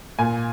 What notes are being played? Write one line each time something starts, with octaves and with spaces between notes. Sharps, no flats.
A#2 G#5